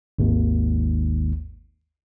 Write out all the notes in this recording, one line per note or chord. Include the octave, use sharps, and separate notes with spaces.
G#1 D#2